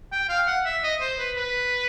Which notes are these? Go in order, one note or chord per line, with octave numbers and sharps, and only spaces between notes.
G5
F5
F#5
E5
D#5
C5
B4
B4